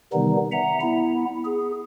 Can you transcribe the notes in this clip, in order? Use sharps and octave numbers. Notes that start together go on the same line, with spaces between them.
C3 D#3 E3 G3 B3 D#4
E5 F#5 A#5
B3 E4
G#4